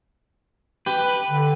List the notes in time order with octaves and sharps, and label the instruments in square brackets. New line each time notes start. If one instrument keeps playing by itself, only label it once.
[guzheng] G4 [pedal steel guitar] B4
[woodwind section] D3